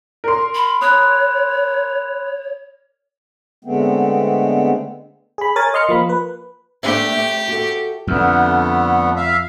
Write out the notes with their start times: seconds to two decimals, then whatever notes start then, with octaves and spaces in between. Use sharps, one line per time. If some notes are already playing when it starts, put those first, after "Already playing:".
0.24 A#4 C6
0.55 B5
0.81 C#5 B5 D#6 F#6
3.64 D3 G#3 A3 B3 C4
5.38 G#4 B5
5.56 A#4 C#5 G#5 A6
5.74 D#5 C6 F6 C#7
5.89 F3 A#3 B5
6.09 B4
6.83 A3 D4 G4 E5 G5
7.13 A3
7.48 F#4 A4
8.07 F2 D3 A3 B3
9.16 E5 F5